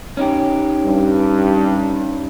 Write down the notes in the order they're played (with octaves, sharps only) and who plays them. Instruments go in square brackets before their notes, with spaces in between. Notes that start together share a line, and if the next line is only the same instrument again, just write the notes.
[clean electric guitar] C#4 D#4 G4
[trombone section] G2